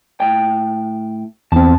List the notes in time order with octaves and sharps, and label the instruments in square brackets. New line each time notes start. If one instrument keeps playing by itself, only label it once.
[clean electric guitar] A2 G5
[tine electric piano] E2 C4 [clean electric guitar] A5